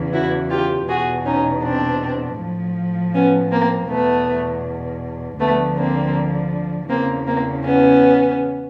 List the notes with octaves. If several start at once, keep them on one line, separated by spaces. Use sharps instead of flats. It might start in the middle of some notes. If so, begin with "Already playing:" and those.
Already playing: E2 C#3 E3
E4 F#4
F4 G4
E2 B2 F#4 G#4
C#4 D#4
C4 D4
A2 F3
B3 C#4
A#3 C4
E2 B2 A3 B3
D2 D3 F3 A3 B3
A#3 C4
E2 C#3 E3 A#3 C4
A#3 C4
B3 C#4